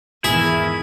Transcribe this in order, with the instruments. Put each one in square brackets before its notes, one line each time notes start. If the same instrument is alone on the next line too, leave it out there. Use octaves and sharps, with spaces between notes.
[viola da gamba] E2 G#2 D#3 [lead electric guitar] E4 [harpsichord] G#4